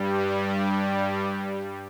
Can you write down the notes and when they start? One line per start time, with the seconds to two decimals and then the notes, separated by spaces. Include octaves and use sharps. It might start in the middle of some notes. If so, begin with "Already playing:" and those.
Already playing: G2 G3